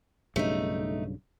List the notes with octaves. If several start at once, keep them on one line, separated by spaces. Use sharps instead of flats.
B1 G2 C#3 A3 D#4